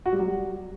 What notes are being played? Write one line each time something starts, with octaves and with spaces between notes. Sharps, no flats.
F#4
G3
F#3
G3